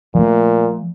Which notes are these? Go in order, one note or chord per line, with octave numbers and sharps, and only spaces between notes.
A#2 F3 A3